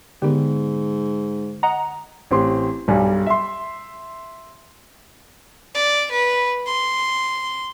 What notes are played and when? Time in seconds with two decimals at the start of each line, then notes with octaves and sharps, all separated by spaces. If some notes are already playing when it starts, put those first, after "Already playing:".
0.22 G#2 D3 D#3 B3 G4
1.63 D#5 F#5 A#5
2.31 A1 C4 G4 C6
2.88 B1 G2 G3 G#5
3.26 E5 C6
5.75 D5
6.12 B4
6.67 C6